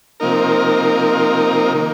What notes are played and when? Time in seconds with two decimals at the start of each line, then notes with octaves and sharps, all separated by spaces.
0.20 C3 F3 A#3 D#4 A#4
1.74 D#3 A#3